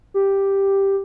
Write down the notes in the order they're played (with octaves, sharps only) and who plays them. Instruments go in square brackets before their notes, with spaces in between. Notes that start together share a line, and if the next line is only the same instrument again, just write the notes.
[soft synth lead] G4